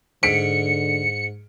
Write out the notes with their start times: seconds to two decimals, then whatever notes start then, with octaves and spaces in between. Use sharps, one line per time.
0.23 G#2 D3 B6 C#7 D7